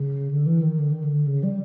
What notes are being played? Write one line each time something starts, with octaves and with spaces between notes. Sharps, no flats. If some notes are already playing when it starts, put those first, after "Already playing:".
Already playing: C#3
D3
E3
D#3
D3
D#3
D3
C#3
G3